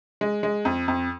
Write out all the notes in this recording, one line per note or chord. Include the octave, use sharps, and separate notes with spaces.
G#3
G#3
F2
F2